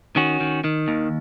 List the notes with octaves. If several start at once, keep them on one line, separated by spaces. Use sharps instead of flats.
D#3 C#4 F#4
D#3
D#3
D#2